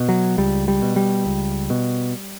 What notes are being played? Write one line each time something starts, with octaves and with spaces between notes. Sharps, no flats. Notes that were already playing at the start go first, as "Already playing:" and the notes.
Already playing: B2
F#3
C#2 G3
G3
B2
G3
C#2
B2